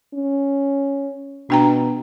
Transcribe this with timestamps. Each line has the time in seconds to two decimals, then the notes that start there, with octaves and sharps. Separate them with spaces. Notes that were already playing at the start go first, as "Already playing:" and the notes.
0.14 C#4
1.50 B2 D4 G5 A#5